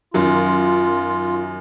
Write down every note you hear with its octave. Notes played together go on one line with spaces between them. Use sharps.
F#2 D#3 F#3 F4